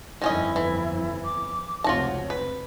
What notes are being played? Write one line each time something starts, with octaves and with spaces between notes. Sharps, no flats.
G1 F2 D#3 C#4 E4 D#5
E3
D6
F1 C#2 C4 F4 F#4 C#5 A5
B4